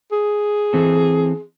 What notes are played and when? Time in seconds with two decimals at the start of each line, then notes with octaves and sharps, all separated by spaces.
0.12 G#4
0.73 E3 C4 A4